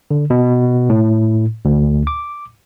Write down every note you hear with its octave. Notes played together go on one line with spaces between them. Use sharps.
D3
B2
A2
D2
D6